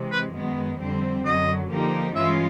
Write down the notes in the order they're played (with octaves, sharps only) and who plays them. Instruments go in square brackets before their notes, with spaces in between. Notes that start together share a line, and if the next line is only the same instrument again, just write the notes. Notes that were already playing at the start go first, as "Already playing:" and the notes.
Already playing: [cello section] C3 E3 G#3
[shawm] B4
[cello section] F#2 D#3 G#3 B3
F2 D3 G3 C4
[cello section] F#2 D3 F#3 [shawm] D#5
[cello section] D3 F3 A#3 D#4 G4
[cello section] G2 E3 G#3 C#4 F4 [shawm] E5